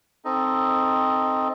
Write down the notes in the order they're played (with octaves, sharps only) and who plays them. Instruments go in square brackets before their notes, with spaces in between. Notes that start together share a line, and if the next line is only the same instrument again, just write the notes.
[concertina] C4 D#4 A4 D#5